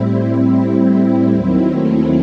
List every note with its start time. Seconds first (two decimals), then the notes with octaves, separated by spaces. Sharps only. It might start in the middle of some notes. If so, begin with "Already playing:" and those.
Already playing: A2 G3 C4 E4
0.14 C4 E4
1.32 D#2 D#3 F#3
1.71 A3 C4